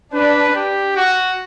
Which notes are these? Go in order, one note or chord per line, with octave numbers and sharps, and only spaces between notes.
D4 B4
G4
F#4